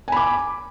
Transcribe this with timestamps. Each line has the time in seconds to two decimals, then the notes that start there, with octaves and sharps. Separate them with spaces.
0.08 G#5
0.12 B5
0.17 D6